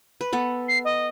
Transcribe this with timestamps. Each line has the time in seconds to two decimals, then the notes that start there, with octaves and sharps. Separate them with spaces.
0.21 B4
0.33 B3 A4
0.68 C7
0.84 D#5